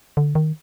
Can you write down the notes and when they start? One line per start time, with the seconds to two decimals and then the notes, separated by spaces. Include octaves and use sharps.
0.17 D3
0.35 D#3